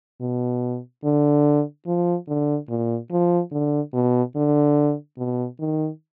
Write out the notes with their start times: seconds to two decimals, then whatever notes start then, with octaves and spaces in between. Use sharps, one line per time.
0.21 B2
1.04 D3
1.87 F3
2.28 D3
2.69 A#2
3.11 F3
3.52 D3
3.94 B2
4.36 D3
5.18 B2
5.59 D#3